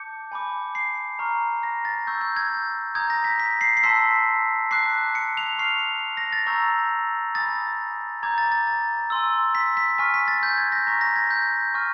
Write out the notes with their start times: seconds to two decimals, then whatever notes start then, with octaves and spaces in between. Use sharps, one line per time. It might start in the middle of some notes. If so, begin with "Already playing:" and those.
Already playing: A5 D6 G6 C#7
0.32 G#5 B5 D6
0.75 C7
1.19 A#5 C#6 F6
1.63 A#6
1.85 A6
2.07 C#6 E6 G6
2.21 G6
2.36 G#6
2.95 A#5 D#6 G6 G#6
3.10 A#6
3.24 B6
3.40 B6
3.61 C7
3.77 C7
3.83 A5 C6 E6 B6
4.71 A5 D6 F#6 C7
5.15 C#7
5.37 F7
5.59 C#6 F6 C7
6.17 A#6
6.33 A6
6.47 A#5 C#6 E6 G6
7.35 G#5 B5 D#6 A6
8.23 A#5 D6 G6 G#6
8.38 A6
8.52 A6
8.67 A6
9.10 G#5 C6 E6
9.55 B6
9.77 B6
9.98 G#5 C#6 F6 B6
10.14 B6
10.28 A6
10.43 G6
10.58 G#6
10.72 A#6
10.87 A#5 C#6 F6 B6
11.01 A#6
11.16 G#6
11.30 G6
11.74 G#5 C#6 F6